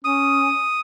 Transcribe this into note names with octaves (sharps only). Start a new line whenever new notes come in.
C#4 D#6